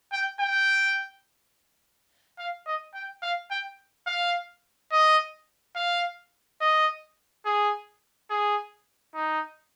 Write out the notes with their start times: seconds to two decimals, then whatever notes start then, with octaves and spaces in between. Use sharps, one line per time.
0.13 G5
0.41 G5
2.39 F5
2.67 D#5
2.94 G5
3.22 F5
3.51 G5
4.07 F5
4.92 D#5
5.76 F5
6.61 D#5
7.45 G#4
8.30 G#4
9.15 D#4